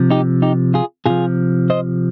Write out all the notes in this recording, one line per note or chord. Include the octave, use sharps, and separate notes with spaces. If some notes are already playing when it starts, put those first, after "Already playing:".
Already playing: C3 F3
D#4 G4
D#4 G4
F4 G#4
C3 F3 F4 G#4
C5 D#5